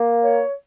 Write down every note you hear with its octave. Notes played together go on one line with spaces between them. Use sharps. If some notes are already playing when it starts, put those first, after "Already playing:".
Already playing: A#3
C#5